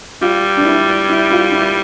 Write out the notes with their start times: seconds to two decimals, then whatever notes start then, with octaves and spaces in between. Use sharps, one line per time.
0.21 G3 F4
0.57 D4
0.65 E4
1.09 E4
1.31 F4
1.52 E4